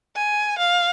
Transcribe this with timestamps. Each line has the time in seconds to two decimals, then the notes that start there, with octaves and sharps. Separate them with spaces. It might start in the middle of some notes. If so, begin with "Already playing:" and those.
0.16 G#5
0.58 F5